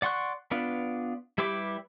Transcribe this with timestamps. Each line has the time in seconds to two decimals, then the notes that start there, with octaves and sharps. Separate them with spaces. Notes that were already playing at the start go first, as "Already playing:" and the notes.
0.02 D5 F#5 C6 C#6 F#6
0.51 B3 D4 F4 B4
1.38 G3 E4 G4 B4 D6